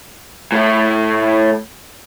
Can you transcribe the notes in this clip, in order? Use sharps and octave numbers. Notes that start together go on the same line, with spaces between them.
A2 A3